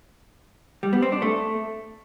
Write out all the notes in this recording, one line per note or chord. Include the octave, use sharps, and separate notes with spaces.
G3
B3
C4
D4
A3